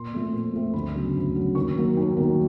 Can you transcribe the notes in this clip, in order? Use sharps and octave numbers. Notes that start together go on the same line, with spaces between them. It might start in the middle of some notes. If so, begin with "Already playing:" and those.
Already playing: A#2 C6
F3 A3 C4
A#2
F3 A3 C4
D2 B5
C#3 F#3 B3
D2
C#3 F#3 B3
D#2 C#6
D#3 F#3 A#3
D#2
D#3 F#3 A#3